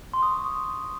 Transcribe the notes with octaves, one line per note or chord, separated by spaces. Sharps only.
C6
D#6
C#6